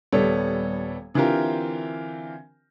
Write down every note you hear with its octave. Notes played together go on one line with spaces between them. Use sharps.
D#1 G3 B3 A4 C#5
D3 E3 C4 F4 G4 A#4